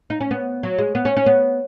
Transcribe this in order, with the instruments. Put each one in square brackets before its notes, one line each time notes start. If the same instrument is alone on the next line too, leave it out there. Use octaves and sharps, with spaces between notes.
[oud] D#4
C#4
B3
F#3
G#3
B3
C#4
C#4
B3